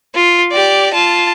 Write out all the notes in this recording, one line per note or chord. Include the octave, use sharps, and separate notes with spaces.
F4
G4 D5
F4 A5